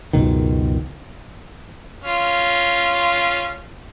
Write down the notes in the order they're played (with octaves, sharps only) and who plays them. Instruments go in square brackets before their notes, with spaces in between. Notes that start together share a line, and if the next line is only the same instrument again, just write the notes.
[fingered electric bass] C#2 F#2 B2 D#3
[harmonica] C#4 F4